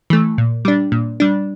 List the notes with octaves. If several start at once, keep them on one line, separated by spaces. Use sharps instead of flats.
E3 A3
A#2
G3 D4
A#2
G3 D4